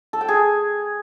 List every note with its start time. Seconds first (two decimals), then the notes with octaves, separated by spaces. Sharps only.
0.13 A4
0.21 G5
0.28 G#4